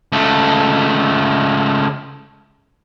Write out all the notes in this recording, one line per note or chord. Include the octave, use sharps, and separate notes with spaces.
C#2 A3